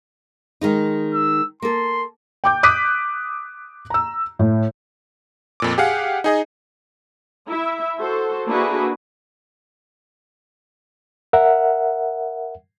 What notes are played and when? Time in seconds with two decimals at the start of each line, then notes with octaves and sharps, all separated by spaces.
0.61 D#3 G#3 D#4
1.14 E6
1.62 A#3 A4 C6
2.44 G5 D6 G6
2.63 D6 D#6 F#6 B6 D#7
3.90 A#5 E6
4.39 A2
5.60 F2 A#2 D6
5.78 G4 G#4 F5 F#5
6.24 D#4 G#4 D#5
7.47 E4 E5
7.99 F#4 A4 C5
8.47 A#3 D4 E4 F#4 G#4 B4
11.33 A#4 E5 F#5